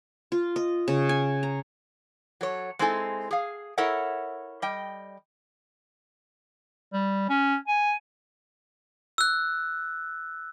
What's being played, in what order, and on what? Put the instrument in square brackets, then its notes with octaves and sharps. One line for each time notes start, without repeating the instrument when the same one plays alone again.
[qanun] F4
D#5
C#3
G#5
A#5
[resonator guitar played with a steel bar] F#3 A4 C#5
G#3 C4 D#4 E4 A4 G#5
G#4 F5
E4 A4 A#4 C#5 E5 F#5
G3 D#5 G5
[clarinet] G3
C#4
G#5
[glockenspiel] E6 F#6